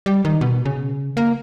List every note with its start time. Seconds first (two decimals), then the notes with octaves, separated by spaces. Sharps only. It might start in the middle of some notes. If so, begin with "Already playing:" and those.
0.06 G3
0.25 D#3
0.41 B2
0.65 C#3
1.17 A#3